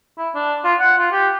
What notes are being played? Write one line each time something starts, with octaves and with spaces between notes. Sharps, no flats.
E4
D4
F4
F#5
F4
G4